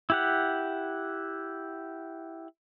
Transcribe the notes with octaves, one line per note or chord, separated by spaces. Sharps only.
E4 G4 F#5